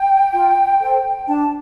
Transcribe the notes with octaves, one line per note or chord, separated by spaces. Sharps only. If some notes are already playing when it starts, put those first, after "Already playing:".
Already playing: G5
F4
A4 C5
D4 A5